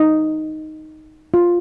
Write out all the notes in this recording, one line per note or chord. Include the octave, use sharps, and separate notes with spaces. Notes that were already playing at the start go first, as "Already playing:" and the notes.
Already playing: D#4
F4